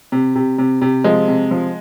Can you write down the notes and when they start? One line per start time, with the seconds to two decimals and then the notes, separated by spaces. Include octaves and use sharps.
0.12 C3
0.36 C3
0.58 C3
0.82 C3
1.04 F3 G#3
1.28 C3
1.51 F3